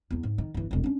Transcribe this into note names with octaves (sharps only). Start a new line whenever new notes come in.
E2 B3
G#2
D#3
G1 E3
E1 C2
C#4 D4